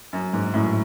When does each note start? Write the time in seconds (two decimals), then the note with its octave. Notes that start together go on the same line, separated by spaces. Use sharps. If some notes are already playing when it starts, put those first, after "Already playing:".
0.13 F#2
0.33 G#2
0.54 F#2 A2